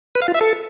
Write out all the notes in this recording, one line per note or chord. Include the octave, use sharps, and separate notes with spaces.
B4
F5
F4
E5
A4